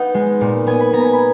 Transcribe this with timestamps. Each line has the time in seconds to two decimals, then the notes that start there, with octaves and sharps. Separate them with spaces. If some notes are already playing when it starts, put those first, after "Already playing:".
Already playing: B3 D#4 F#5
0.14 G#3
0.41 A#2
0.67 B3 G#5
0.80 B5
0.93 B3 A#5
1.07 G#5
1.13 B5